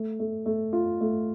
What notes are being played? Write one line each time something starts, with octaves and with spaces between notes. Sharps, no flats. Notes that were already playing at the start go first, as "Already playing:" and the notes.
Already playing: A3
A3
A3
F4
A3